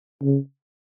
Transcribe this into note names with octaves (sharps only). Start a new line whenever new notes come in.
C#3